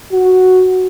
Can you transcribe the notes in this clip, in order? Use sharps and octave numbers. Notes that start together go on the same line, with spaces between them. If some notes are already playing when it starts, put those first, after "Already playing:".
F#4